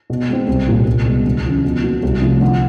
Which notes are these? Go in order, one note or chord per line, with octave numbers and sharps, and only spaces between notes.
B2
G#3 C4
C2
A#2 G3 A#3
C2
B2 G#3
D2
C#3 F3
B2
F#3 A#3
C2
C3 F3 A3
D3